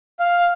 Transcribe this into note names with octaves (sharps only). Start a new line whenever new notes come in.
F5